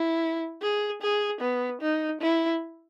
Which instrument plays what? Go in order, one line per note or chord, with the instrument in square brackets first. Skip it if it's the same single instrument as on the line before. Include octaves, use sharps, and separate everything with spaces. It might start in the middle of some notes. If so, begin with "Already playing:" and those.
Already playing: [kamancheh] E4
G#4
G#4
B3
D#4
E4